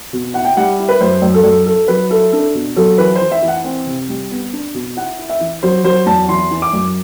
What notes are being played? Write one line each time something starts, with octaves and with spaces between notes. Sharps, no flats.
B2
E4 F#5
G5
G3 F#5
E4
B4
F#2 C5
F#2
A4
F#2
E4 A4
F#3 B4
E4 A4
D4 A4
B2
F#3 A4
E3 B4
C5
E3
E5
E3
F#5
C4
C3
G3
B3
D4
B2
E4 F#5
E4
E5
E3
F#3 C5
F#3 C5
E2 A5
E3 C6
E3
D6
F#2